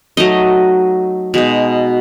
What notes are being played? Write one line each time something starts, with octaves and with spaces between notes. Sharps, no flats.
F#3 A3 D#4 D#5
B2 G#3 D#4